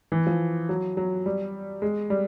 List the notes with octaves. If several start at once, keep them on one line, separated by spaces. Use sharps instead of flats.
E3
F3
F#3
F#3
G3
G#3
G3